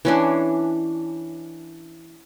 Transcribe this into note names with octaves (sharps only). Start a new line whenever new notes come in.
E3 C#4 D4